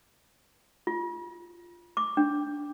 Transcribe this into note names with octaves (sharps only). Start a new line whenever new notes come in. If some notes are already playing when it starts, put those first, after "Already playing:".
F4
D6
D4